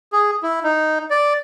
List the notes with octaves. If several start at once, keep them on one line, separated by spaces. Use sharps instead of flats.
G#4
E4
D#4
D5